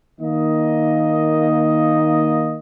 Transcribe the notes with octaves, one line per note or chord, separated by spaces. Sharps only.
D#3 A#3 D#5